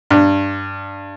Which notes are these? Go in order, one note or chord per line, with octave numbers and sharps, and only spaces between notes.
G2